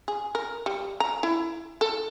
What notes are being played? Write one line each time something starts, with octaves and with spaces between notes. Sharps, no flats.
G#4
A#4
G3
A#5
E4
A4